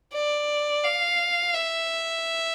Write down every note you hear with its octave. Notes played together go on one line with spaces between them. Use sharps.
D5
F5
E5